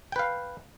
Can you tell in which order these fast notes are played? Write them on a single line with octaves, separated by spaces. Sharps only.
G5 B4 F5